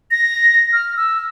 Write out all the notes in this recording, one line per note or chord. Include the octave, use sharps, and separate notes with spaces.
A#6
F6
E6